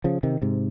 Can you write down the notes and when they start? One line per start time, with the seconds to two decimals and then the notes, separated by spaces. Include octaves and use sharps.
0.04 C#3 F3
0.23 C3 D#3
0.42 G#2 C3